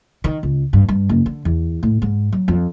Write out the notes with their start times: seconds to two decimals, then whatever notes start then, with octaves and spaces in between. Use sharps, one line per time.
0.24 D#3
0.43 C#2
0.73 G2
0.89 G2
1.09 F#1
1.26 D3
1.45 E2
1.83 A2
2.02 G#2
2.32 F#3
2.48 F2